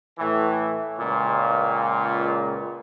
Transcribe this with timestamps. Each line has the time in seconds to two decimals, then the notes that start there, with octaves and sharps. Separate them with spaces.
0.18 A2 E3
0.99 C#2 A#2